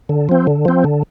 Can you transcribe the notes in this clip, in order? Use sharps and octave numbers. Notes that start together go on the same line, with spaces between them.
D3
F3 C4
D3
F3 C4
D3